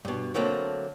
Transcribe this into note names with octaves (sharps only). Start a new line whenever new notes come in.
G2 B2
D3 F#3 A3 A#3 C4